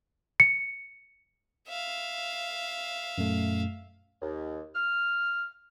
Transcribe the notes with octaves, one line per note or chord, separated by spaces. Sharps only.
C#7
E5 F5
F#2 A#2 A3
D#2
F6